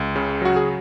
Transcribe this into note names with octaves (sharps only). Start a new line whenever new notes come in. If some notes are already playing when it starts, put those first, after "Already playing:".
Already playing: C#2
C#3
F#3 F#4
G#4